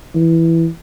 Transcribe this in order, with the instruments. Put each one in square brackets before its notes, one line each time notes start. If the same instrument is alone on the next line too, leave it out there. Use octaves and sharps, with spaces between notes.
[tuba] E3